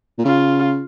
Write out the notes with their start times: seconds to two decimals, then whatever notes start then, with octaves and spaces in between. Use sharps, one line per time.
0.18 A#2
0.25 C#3 F4